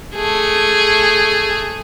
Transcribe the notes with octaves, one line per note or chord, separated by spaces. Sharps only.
A3 G#4